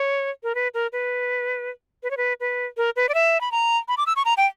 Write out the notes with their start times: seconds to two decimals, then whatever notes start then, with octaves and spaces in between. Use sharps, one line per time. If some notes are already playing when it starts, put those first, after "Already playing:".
Already playing: C#5
0.43 A#4
0.55 B4
0.74 A#4
0.92 B4
2.03 B4
2.11 C#5
2.17 B4
2.40 B4
2.77 A#4
2.96 B4
3.09 D5
3.14 E5
3.41 B5
3.52 A#5
3.88 B5
3.97 D6
4.07 E6
4.16 C#6
4.25 A#5
4.37 G5